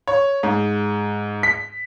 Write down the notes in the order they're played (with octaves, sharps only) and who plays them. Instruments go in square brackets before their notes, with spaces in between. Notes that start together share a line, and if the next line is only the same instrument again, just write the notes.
[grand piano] C#5
G#2
B6